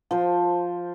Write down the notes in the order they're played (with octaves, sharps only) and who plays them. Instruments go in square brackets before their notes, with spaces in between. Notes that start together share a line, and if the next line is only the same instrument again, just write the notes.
[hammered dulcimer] F3 C5